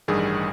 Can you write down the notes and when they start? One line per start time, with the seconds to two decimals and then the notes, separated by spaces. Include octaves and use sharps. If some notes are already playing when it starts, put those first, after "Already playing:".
0.08 A1 G2 D#3 G3 G#4